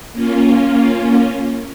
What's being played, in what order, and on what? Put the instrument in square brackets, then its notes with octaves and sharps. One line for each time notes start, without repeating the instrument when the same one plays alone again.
[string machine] A#3 C#4 F4